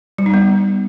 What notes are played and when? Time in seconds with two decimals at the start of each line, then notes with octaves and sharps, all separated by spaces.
0.18 G3
0.26 D#4
0.34 B3